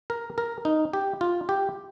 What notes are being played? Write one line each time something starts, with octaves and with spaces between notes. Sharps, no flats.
A#4
A#4
D#4
G4
F4
G4